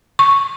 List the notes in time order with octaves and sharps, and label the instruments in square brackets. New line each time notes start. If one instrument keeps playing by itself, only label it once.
[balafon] C#6